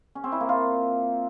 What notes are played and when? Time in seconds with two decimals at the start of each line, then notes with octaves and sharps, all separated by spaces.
0.15 C#4
0.24 C4
0.32 E4
0.41 A#3
0.49 F4